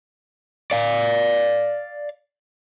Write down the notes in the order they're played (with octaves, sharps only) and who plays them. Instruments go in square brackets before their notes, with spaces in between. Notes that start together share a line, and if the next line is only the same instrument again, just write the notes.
[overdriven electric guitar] D5 F5